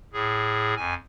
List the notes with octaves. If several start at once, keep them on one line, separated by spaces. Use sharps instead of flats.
A2 G#4
F2 G#5